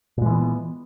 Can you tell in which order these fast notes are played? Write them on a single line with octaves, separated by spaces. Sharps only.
A#2 G#3 E3 B3